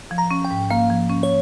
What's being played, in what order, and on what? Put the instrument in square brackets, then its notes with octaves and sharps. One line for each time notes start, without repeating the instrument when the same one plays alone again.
[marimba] F3
[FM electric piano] A#5
[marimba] C#4
[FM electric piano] G5
[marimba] G#2
[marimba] A#3 [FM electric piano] F5
[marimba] F3
C#4
[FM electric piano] C#5